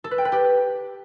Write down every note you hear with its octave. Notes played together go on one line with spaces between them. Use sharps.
A4
B4
G5
B4
G4